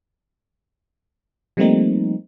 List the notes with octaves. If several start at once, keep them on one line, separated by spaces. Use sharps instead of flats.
F3 G3 A3 A#3 C4 D#4